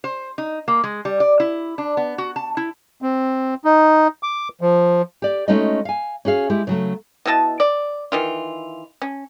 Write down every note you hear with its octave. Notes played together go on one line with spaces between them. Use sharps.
C5
D#4
A#3
G#3
G3
D5
E4
D4
B3
F#4
A5
E4
C4
D#4
D6
F3
G4 D5
G#3 A3 C#4 D#4 F#4 D#5
F5 G#5
C#4 F#4 G#4 F5
G#3 E4 G4
C#3 F#3 A3
B2 E4 D#5 A5
D5
D#3 E3 F4
C#4